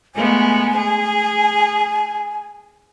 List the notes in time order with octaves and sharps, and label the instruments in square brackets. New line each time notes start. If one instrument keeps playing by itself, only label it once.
[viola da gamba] G#3 A3 B3 [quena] G#5
[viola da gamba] G#4